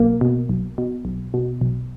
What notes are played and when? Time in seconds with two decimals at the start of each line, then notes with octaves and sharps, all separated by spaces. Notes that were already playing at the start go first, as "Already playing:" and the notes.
Already playing: B1 A#3
0.21 B2
0.49 B1
0.78 B2
1.05 B1
1.34 B2
1.61 B1